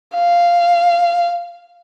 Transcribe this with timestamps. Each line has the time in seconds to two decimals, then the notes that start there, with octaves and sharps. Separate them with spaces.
0.15 F5